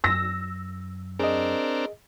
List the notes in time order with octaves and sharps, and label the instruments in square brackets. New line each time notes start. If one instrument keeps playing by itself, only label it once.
[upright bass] F#2 [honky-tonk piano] E6 A#6
[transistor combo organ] C4 D4 A#4 [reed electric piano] G#4 D#5